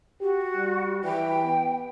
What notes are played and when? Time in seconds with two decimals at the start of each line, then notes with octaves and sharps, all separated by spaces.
0.20 F#4 G4
0.56 G3
1.03 E3 G5
1.44 B3